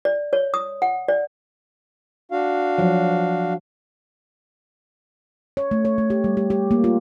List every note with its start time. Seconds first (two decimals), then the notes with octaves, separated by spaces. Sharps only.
0.05 D5
0.33 C#5
0.54 D#6
0.82 F#5
1.08 D5
2.31 D4 F#4 F5
2.78 F3 F#3
5.57 C#5
5.71 A3
5.85 C#5
5.98 A3
6.10 G4
6.24 G3
6.37 G4
6.50 G4
6.71 A#3
6.84 F4